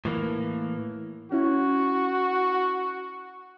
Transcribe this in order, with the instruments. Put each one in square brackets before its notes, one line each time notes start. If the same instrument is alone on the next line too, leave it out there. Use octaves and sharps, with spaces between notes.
[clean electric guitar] A2 E3 A#3
[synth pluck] C#4 E4 [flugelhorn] F#4